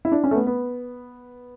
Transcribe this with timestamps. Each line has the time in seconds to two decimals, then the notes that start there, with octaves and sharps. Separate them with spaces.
0.05 E4
0.12 D4
0.24 C#4
0.31 A3
0.35 B3
0.47 B3